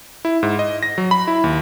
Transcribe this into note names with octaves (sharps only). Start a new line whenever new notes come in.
E4
G#2
D#5
A#6
F#3
B5
E4
D#2